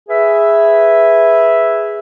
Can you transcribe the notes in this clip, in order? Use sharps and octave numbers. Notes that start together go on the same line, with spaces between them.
G#4 B4 E5